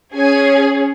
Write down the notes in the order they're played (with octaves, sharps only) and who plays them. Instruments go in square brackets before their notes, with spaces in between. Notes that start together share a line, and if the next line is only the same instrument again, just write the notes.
[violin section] C#4 G#4 G#5